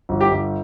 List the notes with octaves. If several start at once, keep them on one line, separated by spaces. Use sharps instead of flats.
G1
G4
G1